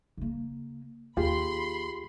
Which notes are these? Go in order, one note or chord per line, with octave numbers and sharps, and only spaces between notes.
C#3 A#3
D#2 F4 G4 G#4 B5 C6